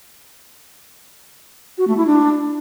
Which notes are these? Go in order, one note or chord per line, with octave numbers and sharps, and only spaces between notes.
F#4
A3
E4
D4